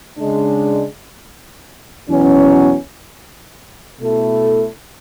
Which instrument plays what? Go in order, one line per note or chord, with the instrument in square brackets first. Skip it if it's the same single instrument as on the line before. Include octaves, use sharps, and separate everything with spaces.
[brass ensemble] C#3 G#3 D4
E2 B2 F#3 C#4
B2 A3 E4 A4